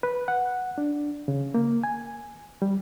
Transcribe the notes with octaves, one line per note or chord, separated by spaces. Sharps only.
B4
F#5
D4
C#3
A#3
G#5
G3